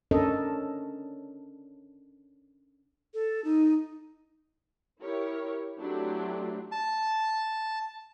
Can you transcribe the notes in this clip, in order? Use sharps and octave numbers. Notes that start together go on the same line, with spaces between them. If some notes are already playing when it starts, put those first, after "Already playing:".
C#4 D4 A4 A#4 C#5 D#5
A4
D#4
E4 G4 A#4 C#5
F#3 A3 C4 D4 E4 G4
A5